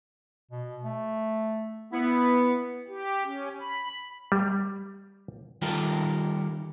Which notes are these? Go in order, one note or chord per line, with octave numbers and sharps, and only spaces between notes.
B2
A3
B3 E4
G4
C#4
B5
G3
D#3 G3 F4 G4 A4 A#4